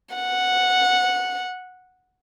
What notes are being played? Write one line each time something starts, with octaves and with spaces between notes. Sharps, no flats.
F#5